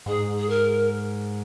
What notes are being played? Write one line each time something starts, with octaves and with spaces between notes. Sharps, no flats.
G#2 G#4
G#4
A#4